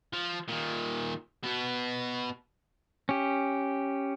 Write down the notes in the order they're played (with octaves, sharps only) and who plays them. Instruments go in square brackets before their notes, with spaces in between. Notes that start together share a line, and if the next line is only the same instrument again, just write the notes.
[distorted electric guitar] F3
A#2 D#3
B2 B3
[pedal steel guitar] C#4 G4